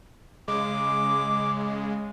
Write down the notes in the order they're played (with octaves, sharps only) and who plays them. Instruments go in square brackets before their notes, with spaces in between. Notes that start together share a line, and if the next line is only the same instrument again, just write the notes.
[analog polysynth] C#3 G#3 [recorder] D6